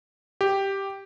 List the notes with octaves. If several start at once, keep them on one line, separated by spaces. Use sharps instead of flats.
G4